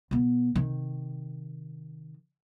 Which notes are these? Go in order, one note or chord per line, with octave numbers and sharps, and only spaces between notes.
B2 B3
C3 D#3